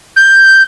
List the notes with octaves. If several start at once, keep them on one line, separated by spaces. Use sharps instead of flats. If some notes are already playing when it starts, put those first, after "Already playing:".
G6